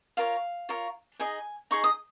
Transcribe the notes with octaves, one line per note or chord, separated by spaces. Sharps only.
F4 A#4 C#5 F5
F4 A#4 C#5
D#4 G#4 D#5 G#5
D#4 G#4 D#5 C#6
D#6